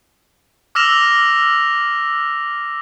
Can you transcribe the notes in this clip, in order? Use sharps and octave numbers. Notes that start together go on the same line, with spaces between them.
D6 E6 F6 A#6 E7 F7